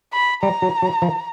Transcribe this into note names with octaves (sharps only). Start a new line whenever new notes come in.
B5
G3 A#5
F#3
F#3
F3